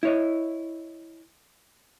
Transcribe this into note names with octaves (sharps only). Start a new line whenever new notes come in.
E4 C#5 D#5